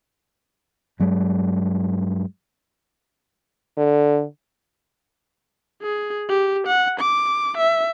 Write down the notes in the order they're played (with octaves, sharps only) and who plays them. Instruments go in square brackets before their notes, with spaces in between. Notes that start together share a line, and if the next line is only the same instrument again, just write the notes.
[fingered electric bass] G2 F#3 G#3
[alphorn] D3
[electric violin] G#4
G4
F#5
D6
E5